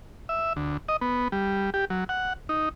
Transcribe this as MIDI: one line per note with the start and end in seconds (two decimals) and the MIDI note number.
0.29 0.53 76
0.56 0.77 38
0.89 0.96 75
1.01 1.28 59
1.32 1.70 55
1.74 1.85 67
1.90 2.04 54
2.09 2.33 78
2.49 2.69 63